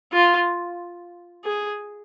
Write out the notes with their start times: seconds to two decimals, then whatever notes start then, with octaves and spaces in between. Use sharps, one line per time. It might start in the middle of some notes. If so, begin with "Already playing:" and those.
0.12 F4
1.44 G#4